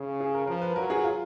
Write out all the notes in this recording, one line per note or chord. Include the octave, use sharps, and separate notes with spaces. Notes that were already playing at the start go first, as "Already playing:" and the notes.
Already playing: C#3 G#4
G#4
A#4
F3 A#4
B4
F#3 A#4
G#4
F4